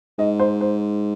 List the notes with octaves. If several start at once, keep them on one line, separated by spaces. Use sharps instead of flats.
G#2 D#5
C5
C5